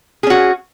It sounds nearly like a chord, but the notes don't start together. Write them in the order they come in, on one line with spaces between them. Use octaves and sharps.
G#4 C#4 F#4